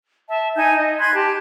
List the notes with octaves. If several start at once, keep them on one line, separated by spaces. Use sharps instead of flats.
E5 A5
D#4 G#5 G6
D#5
B5 C6 F#6 G#6
G4 A5